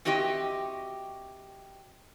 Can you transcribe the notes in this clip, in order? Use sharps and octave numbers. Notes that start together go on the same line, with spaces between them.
C4 F#4 G4 D#5 E5